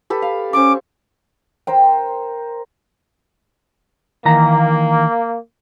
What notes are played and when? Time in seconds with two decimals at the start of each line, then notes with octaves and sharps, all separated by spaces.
0.10 G4 A4 B4
0.22 F5
0.53 C#4 C5 C#6 D6
1.67 A#4 C5 G5
4.25 D#3 E3 A#3 A#5